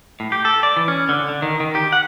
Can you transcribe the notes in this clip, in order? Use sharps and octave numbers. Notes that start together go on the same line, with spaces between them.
A2
G4
A4
D5
E3
C#4
D3
D3
D#3
D#3
G4
F#5